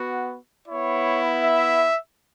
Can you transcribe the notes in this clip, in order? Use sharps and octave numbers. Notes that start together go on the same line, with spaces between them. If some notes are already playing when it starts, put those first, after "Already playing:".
Already playing: B3 F#4
B3 E4 C#5
E5